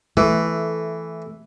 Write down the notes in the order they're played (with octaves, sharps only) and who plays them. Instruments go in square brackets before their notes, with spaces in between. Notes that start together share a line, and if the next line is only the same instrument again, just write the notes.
[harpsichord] E3 [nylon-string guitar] A3